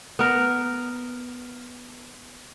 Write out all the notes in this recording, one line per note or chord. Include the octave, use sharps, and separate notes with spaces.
B3 A#4